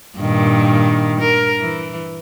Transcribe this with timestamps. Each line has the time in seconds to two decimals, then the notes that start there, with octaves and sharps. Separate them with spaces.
0.18 G2 A#2 D#3
1.21 A#4
1.61 E3